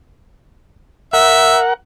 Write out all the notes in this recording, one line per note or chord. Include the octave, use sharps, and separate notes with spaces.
A#4 E5 F#5